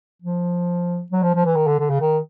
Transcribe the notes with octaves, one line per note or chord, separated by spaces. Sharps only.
F3
F#3
F3
F3
E3
D#3
D3
D3
C#3
D#3